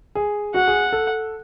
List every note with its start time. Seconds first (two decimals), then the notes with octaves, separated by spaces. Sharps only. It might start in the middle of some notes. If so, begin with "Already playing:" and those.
0.15 G#4
0.54 F#4 F#5
0.68 G#4
0.93 A4